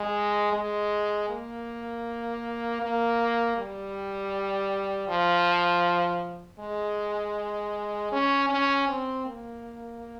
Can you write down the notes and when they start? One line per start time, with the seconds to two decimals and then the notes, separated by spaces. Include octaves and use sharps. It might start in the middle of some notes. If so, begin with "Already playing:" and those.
Already playing: G#3
0.53 G#3
1.29 A#3
2.81 A#3
3.57 G3
5.08 F3
6.59 G#3
8.12 C#4
8.49 C#4
8.88 C4
9.26 A#3